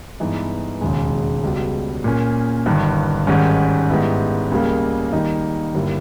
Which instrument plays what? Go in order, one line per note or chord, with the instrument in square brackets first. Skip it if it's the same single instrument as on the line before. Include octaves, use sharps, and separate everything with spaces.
[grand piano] G2 E3 G#3 B3 D#4
E1 D#2 C#3 G#3
C#2 B2 G3
A#2 A#3 C#4
G1 G2 D#3
G#1 G#2 D#3 G3 C#4
G#2 D#3 G3 B3 E4
C#2 C#3 G3 A#3
D#3 G3 A#3 D#4
G1 G3 A#3 E4